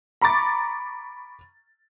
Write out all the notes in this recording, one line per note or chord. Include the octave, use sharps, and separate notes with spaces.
A#5 B5 C#6 D6 A6